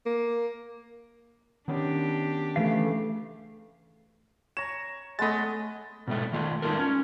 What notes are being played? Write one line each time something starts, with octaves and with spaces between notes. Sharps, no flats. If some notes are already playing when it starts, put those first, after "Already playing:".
A#3
D#3 B3 C#4 D4 G4
C#3 E3 A3 F5
C#5 A#5 E7
G#3 A3 B3 D#5 A6
B2 G#3 A3
D#3 A3 F4
G#3 D#4 F4 A4 A#4
C#4